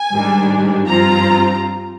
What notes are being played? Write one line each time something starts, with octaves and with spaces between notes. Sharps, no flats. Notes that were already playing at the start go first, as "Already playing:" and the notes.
Already playing: G#5
G#2 D#3 G3 D4
G2 F3 C4 F4 A#5